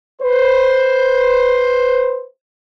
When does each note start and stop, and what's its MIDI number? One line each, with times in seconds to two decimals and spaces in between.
0.21 2.26 71
0.21 2.26 72